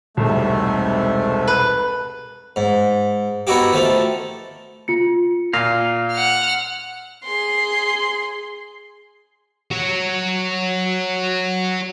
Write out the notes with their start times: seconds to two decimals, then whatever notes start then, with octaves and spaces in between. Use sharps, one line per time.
0.17 E1 C2 G#2 C3 A3
1.48 B4
2.56 G#2
3.47 B3 D#4 E4 F#4 G4
3.73 D#3 F3 A3
4.88 F4 C#7
5.53 A#2 F5 A#6
6.12 F#5 F6
7.24 G#4 C6
9.71 F#4 C#5